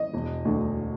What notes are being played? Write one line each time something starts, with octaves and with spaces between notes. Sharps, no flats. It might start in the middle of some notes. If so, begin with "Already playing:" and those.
Already playing: D#5
E1
D2 D3